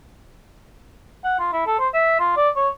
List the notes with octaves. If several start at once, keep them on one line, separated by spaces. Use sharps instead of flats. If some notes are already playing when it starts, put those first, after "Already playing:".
F#5
F4
E4
A4
C5
E5
F4
D5
C#5